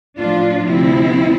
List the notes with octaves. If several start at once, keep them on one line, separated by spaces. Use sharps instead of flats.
A2 F3 D4 F4
D2 C3 F3 C4 E4